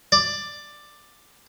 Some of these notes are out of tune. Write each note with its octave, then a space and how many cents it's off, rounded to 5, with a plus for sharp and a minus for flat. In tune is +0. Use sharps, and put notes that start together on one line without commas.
D5 +10